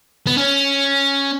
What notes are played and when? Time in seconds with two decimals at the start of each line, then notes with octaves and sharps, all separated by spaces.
0.27 B3
0.37 C#4